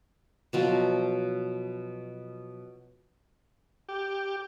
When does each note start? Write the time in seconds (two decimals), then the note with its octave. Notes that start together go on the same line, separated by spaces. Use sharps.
0.53 B2 F3 F#3
3.89 G4